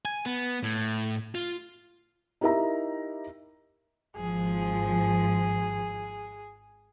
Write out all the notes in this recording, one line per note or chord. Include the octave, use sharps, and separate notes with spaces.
G#5
B3
A2
F4
D#4 E4 G4 A#4 E5 A#5
G#1 F3 G#4